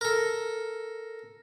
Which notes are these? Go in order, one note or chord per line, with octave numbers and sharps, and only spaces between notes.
A4 A#4